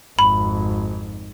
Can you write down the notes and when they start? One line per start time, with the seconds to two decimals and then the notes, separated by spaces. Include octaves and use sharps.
0.19 G#1 F2 B5